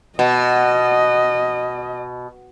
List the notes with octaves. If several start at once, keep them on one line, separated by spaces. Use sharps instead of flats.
B2 D#5